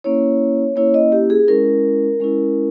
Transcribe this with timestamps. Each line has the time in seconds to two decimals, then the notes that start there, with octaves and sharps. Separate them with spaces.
0.04 A#3 C#4 E4 C#5
0.76 A#3 C#4 E4 C#5
0.94 D#5
1.12 G4
1.30 G#4
1.48 G#3 C#4 E4 A#4
2.20 G#3 C#4 E4